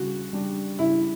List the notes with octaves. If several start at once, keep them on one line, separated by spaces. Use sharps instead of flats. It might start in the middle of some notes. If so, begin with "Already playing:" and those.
Already playing: C#3 G3 D4 F#4
G3 D4
C#3 E4